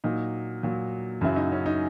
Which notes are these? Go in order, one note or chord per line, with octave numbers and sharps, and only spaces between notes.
A#2 F#3 D#4
A#2 F#3
F#2 C#3 F#3 E4
D#4
C#4
D#4